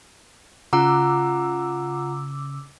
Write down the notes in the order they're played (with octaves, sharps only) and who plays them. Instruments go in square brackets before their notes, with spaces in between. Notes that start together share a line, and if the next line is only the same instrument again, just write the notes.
[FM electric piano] C#3 D6 E6 [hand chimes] F4 F#5 A#5